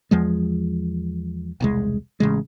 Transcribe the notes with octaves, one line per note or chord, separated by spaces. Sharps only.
E2 F3 G#3
E1 C2 G#3
A1 C#3 G#3